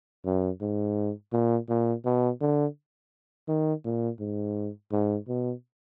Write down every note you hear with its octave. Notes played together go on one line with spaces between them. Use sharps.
F#2
G#2
A#2
A#2
B2
D3
D#3
A#2
G#2
G#2
B2